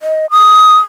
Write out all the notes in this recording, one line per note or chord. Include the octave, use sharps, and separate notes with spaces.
D#5
D#6